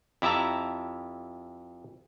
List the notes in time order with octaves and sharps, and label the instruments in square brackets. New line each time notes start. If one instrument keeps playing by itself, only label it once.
[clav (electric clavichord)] F2 E4 G4 E5 A5 A#5